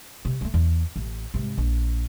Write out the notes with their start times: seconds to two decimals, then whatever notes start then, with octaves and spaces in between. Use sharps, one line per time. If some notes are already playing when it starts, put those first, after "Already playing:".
0.25 C3
0.41 F#3 A3
0.54 E2
0.96 A1
1.34 G#2 C3
1.58 A#1